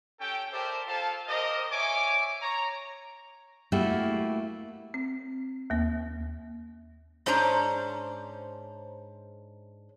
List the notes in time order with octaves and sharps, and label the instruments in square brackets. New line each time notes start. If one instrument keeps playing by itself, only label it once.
[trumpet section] C#4 G4 A4 G5
G4 A#4 C5 D5 E5 A5
F4 A4 C5 F5 A5
G4 A#4 C5 D#5
C#5 E5 G#5 D6
C#5 A#5
[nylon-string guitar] A3 A#3 E4 F#4 G4
[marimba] C4
D#2 A#3
[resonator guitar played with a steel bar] G#2 C#4 D4 C5 A#5